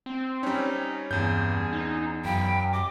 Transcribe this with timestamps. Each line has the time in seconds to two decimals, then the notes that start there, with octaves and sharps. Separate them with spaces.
0.06 C4
0.43 G3 C#4 D#4
1.11 E2 G2 C4 C#4 G#4 G6
1.73 D#4
2.25 F#2 F5 G5 B5
2.73 G4 D#5 D6